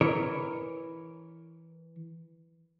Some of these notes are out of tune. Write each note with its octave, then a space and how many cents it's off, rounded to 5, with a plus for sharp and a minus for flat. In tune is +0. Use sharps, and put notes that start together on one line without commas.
E3 +0 A#4 +0 C#5 +0